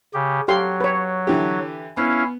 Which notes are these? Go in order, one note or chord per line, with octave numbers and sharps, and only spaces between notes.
C#3 G4
F#3 G4 A4 F5 C6
B4 C#5
D3 E3 G4
B3 C#4 E4 F5